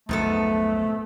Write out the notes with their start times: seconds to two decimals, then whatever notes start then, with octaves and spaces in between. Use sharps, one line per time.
0.09 B1 F2 G#2 C#3 A3 B3 A4